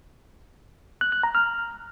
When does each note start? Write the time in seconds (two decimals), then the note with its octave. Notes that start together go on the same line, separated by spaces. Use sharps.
1.01 F#6
1.12 F#6
1.23 A#5
1.35 F6